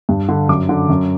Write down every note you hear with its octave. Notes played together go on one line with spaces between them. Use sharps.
G2
D3
F#2 D6
D3
F#2